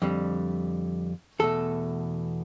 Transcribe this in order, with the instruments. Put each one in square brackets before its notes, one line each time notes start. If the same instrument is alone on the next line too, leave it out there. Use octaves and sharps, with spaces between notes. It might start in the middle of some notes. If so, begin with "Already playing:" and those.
[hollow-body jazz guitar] F2 D3 G3
E2 B2 A3 A4